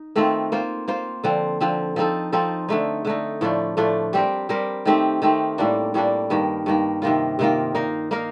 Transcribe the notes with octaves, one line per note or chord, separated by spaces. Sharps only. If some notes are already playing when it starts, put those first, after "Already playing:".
Already playing: D#4
D#3 A3 C4 F4
A#3 F4 C5
A#3 F4 C5
D3 F3 C4
D3 F3 C4
F3 C4 D#4 A4
F3 C4 D#4 A4
D3 A3 D#4
D3 A3 D#4
A2 F3 A3 D4
A2 F3 A3 D4
G3 C4 G4 A#4
G3 C4 G4 A#4
D#3 A3 C4 G4
D#3 A3 C4 G4
A2 G3 A#3 D4
A2 G3 A#3 D4
G2 D#3 A#3
G2 D#3 A#3
C3 D#3 A#3 F4
C3 D#3 A#3 F4
A#3 D#4 A#4 F5
A#3 D#4 A#4 F5